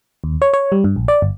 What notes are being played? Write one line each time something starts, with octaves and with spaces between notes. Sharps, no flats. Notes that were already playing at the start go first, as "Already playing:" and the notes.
D#2
C#5
C#5
G3
G2
A#1
D5
G1